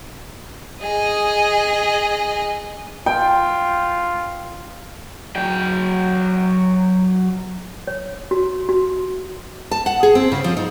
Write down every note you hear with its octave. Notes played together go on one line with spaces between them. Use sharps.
G#4 D#5
F4 G5
F#3 G5
C#5
F#4
F#4
A5
F#5
G#4
C4
C#3
F3
D#4